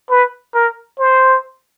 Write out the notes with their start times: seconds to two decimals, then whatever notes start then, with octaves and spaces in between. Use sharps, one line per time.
0.10 B4
0.54 A#4
0.98 C5